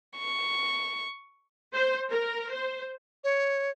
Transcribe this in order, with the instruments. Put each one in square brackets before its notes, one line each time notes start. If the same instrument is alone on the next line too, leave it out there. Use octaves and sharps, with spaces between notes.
[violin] C#6
[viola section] C5
A#4
C5
[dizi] C#5